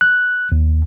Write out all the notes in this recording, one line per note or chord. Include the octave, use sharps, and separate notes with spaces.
F#6
D#2